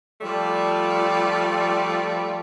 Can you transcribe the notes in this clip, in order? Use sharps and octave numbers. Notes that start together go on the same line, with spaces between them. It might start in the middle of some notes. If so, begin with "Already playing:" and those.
F3 G3 A3 F4 D5